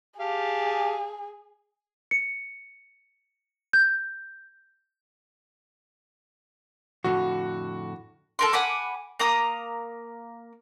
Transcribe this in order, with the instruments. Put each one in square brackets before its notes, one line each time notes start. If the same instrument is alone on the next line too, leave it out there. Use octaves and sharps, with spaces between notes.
[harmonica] G4 F5 A5 [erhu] G#4
[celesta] C#7
G6
[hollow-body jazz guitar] F2 A2 D3 [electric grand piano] F#4
[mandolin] A4 A#4 C6
F#5 G#5 B5 D6
A#3 A#5 D#6